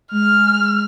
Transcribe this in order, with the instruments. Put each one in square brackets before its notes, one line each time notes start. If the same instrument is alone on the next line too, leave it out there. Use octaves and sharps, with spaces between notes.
[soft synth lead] G#3 [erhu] F6